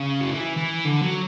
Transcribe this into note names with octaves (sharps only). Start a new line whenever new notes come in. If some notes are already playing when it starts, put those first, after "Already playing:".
Already playing: C#3
F#3
E3
E3
D3
F#3